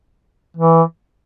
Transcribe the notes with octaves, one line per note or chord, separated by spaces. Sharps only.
E3